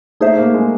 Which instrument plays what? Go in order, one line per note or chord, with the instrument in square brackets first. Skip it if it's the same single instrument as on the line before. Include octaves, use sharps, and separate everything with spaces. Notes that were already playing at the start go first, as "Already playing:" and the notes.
[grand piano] A3 [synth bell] D#4 G#4 C5 E5
[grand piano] A#3
G#3